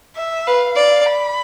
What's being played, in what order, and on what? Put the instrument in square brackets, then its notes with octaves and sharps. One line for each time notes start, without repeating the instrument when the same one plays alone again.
[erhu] E5
[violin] B4 [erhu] F5
[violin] D5
[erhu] B5